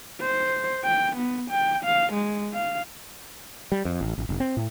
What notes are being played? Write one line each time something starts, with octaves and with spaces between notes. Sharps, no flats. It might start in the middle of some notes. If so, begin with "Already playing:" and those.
C5
G5
B3
G5
F5
G#3
F5
G3
F2
A1
A1
F1
C4
A2